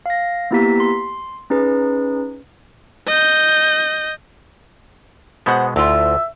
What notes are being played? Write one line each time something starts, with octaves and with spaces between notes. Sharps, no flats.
F5 A#6
A#3 B3 E4 G4 A#5 B6
C6
C#4 D#4 G#4 B4
D#5 G6
B2 G#3 B3 C5 F#5
D2 A2 F4 E5